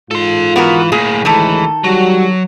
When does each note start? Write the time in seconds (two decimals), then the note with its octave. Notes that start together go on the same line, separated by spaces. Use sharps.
0.11 G#2 F4 A4 C6
0.56 E3 B3 F#4 A#4
0.92 A2 A#3 G#4
1.25 D2 A2 D#3 E3 G#3 A4
1.84 F#3 G3 F#4